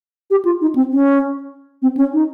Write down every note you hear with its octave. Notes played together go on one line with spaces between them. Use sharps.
G4
F4
D#4
C4
C#4
C4
C#4
D#4